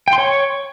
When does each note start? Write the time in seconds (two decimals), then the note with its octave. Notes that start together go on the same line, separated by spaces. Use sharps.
0.08 G5
0.13 C6
0.18 C#5